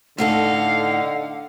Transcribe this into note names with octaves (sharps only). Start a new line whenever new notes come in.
A2 D3 D#4 A4 F5 F#5